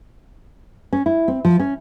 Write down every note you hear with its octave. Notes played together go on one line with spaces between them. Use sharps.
C#4
E4
C4
F3
C#4